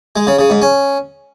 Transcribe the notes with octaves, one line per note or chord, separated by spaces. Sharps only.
G#3
C#3
C#3
G#2
C#4